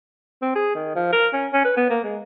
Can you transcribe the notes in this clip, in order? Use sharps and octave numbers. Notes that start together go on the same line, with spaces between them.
C4
G#4
D#3
F3
A#4
C#4
C#4
B4
B3
A#3
G#3